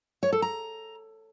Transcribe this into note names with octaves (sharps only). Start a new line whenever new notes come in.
C#5
A4
A#5